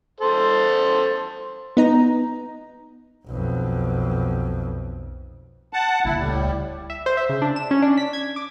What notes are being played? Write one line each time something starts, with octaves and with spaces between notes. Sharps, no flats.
A4 C5
B3 D#4 A#5
B1 F2
F#5 A5
D#1 C#2 E4
A2 G3
E5
C5
E5
C#3
D4
E7
C#4
D4
B6
G#6
D6